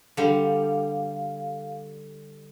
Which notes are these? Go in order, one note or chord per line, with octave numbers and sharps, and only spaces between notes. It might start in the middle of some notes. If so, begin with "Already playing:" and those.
D3 G3 F5